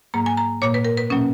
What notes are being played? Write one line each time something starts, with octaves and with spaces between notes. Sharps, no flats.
G#2 F#3 A#3 A#5
G#5
A#5
A#2 A#3 C#5
B4
A#4
B4
B2 F#3 A#3 C#4